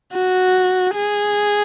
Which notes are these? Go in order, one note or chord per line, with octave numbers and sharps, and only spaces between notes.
F#4
G#4